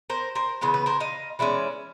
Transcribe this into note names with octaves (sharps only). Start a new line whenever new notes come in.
A#4 C5
A#4 C5
C#3 E3 B3 C5
B4
A#4 C5
D#5 F5
E3 G#3 C#4 D5 E5